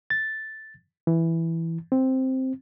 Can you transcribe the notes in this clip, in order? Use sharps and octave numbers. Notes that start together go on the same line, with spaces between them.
A6
E3
C4